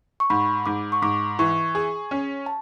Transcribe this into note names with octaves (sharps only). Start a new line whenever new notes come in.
C#6
G#2 B5
G#2 D6
C#6
G#2 D6
E3 C#6
G#4
C#4
A5